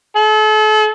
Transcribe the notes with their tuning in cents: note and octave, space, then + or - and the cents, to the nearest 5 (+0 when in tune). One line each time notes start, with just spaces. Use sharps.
A4 -40